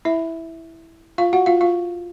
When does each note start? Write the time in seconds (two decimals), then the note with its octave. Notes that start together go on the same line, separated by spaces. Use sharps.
0.05 E4 E5
1.18 F4 F5
1.33 F#4 F#5
1.46 F4 F5
1.61 F4 F5